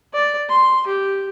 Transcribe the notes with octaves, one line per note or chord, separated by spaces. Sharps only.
D5
C6
G4